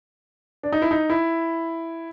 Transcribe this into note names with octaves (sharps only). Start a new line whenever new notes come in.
D4
D#4
E4
D#4
E4